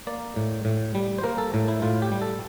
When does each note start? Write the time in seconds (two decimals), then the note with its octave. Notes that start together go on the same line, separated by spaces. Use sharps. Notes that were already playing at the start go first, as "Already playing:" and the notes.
0.07 A#3 D5
0.36 A2
0.65 A2
0.95 G3
1.18 C5
1.24 A#3 A#4
1.38 A4
1.54 A2
1.68 E4
1.82 A2 F4
2.02 G4
2.12 G3
2.22 A4